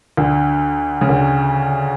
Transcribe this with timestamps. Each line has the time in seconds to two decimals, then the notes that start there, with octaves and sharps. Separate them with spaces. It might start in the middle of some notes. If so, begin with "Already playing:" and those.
0.17 D2 D3
1.01 C#3
1.09 D2 D3